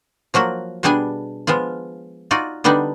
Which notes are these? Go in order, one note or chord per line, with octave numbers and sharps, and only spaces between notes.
F3 F#3 A#3 F#4
B2 G3 B3 D4 G#4 G#5
F3 G#3 B3 F4
D#4 F4 F#4 D5
D3 G3 B3 D4 D#4